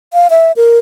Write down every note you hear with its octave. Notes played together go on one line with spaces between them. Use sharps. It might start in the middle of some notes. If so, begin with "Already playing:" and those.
F5
E5
A#4